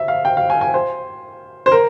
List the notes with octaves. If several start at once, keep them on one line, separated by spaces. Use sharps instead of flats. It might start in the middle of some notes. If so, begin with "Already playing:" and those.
Already playing: E5
F5
G5
F5
G#5
G#5
C5
C5
A#4